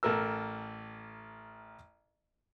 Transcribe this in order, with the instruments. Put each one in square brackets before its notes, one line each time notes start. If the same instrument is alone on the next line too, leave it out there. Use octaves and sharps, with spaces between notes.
[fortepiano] A1 A4 A#4 E6